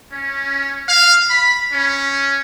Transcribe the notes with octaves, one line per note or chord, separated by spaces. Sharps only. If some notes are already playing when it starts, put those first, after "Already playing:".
C#4
F5
B5
C#4